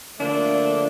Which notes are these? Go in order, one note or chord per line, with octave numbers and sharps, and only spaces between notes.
D3 F3 A3 A#3 D4